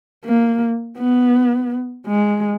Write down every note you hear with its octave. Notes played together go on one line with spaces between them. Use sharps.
A#3
B3
G#3